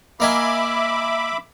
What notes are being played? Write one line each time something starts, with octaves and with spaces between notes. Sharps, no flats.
A#3 D#5 E5 G#5 B5 D6